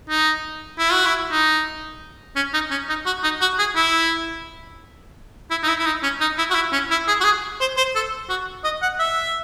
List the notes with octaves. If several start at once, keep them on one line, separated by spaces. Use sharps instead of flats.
D#4
E4
F#4
E4
D#4
C#4
D#4
C#4
D#4
F#4
D#4
F#4
G#4
E4
E4
D#4
E4
E4
D#4
C#4
D#4
E4
F#4
E4
C#4
E4
G#4
F#4
G#4
C5
C5
A4
F#4
D#5
F#5
E5